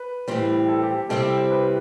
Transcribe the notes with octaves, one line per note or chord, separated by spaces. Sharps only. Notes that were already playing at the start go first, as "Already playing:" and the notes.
Already playing: B4
A2 E3 G3 C4
A4
G4
G4
C3 G3 C4 E4 A4
A4
C5
B4